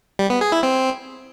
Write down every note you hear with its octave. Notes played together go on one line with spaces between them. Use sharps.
G3
B3
G#4
E4
C4